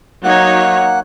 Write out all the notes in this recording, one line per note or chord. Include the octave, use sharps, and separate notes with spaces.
F#3 A#3 D#4 C#5 F#5 F#6